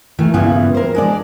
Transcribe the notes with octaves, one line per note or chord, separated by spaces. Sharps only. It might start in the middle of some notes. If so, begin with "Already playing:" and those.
D#3 E3 A3
G2 A#2 C#3 G3 B3 E4
A#4 C5
G#3 D4 D5